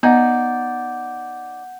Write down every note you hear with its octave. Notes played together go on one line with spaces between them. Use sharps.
B3 D#4 D5 F#5 G6